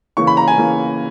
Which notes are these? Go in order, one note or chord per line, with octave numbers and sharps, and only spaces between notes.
C#3 E3 A#3 C#6
B5
A#5
G#5
C#3 E3 A#3